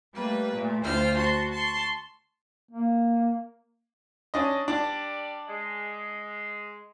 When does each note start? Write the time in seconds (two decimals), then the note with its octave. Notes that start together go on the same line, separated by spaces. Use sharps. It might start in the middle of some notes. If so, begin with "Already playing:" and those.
0.14 G3 A3 A#3 B4
0.52 A#2 A3
0.83 D2 F4 C5 G5 F6
1.17 F#4 A5 C6
1.51 A5 C6 C#6
2.71 A#3
4.34 C#4 D4 D#5
4.68 G3 D4 G4 D5
5.48 G#3